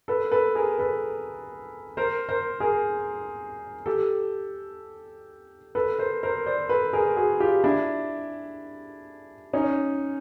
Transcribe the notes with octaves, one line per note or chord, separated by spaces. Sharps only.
A4 B4
A4 B4
G#4 A#4
A4 B4
A#4 C5
A#4 C5
G#4 A#4
G4 A4
A4 B4
A#4 C5
A#4 C5
C5 D5
A4 B4
G#4 A#4
F#4 G#4
F4 G4
D4 E4
C#4 D#4